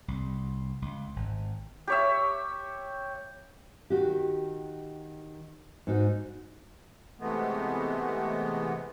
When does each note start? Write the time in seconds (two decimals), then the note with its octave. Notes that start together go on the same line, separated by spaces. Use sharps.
0.08 C2
0.82 C#2
1.16 G#1
1.87 G4 C#5 E5
3.90 D#3 F#4 G4
5.87 G#2 D#4 F#4
7.20 C3 E3 G#3 A3 B3